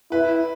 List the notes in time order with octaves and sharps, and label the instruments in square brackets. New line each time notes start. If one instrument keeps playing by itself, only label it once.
[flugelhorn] E4 [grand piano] B4